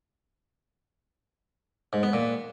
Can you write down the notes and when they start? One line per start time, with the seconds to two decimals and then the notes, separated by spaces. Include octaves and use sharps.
1.93 G#2
2.03 B3
2.13 A#2